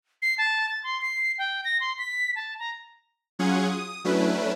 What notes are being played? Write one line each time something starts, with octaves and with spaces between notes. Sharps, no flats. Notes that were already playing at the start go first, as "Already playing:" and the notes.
C7
A5
A6
C6
C7
G5
A#6
C6
B6
A5
A#5
F#3 C#4 F4 G#4 F#5 G#6
D#6
F#3 A3 C#4 D4 E4 B4